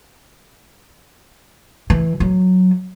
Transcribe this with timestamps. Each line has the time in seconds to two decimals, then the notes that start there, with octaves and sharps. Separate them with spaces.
1.90 E3
2.20 F#3